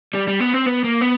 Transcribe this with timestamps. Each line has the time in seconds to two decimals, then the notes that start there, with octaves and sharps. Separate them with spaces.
0.15 G3
0.28 G3
0.41 B3
0.54 C4
0.67 B3
0.84 A#3
1.01 B3